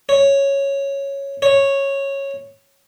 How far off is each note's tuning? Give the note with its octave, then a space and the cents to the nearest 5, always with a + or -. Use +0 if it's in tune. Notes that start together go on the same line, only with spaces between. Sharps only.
C#5 -5
C#5 -10